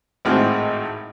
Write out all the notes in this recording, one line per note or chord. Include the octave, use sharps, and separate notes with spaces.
G#1 A2 G#3 C4 F#4 F6